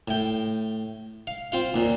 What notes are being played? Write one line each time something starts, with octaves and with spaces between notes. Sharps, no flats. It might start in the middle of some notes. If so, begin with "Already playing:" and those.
A2 G5
F5
C4 F4 F5
D#2 A#2